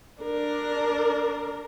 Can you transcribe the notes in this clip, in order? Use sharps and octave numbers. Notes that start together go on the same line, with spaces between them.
D4 A#4